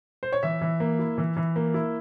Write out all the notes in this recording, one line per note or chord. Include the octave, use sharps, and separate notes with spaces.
C5
C#5
E3 E5
E3
A#3
E4
E3
E3
A#3
E4